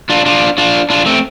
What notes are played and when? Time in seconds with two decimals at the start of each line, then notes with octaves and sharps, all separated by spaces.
0.10 D4 F4
0.26 D4 F4
0.58 D4 F4
0.90 D4 F4
1.06 A3 C4